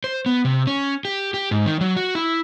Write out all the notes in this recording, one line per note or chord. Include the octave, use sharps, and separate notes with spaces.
C5
B3
C3
C#4
G4
G4
G#2
D#3
F#3
F#4
E4